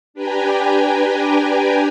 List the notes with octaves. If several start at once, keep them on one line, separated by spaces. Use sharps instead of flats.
D4 G4 B4 G5 G#5 A#5